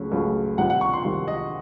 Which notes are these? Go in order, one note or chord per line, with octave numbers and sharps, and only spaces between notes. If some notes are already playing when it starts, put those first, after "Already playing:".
Already playing: C#2 C#3 F#3 A3 C#4
C#2 C#3 F#3 A3 C#4
C2 C3 D#3 F#5
F#5
C#6
C6
C2 C3 D#3
D#5